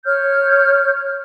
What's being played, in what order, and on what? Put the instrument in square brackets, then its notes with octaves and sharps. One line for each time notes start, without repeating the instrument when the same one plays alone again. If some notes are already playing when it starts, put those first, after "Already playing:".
[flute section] C#5 F6 G6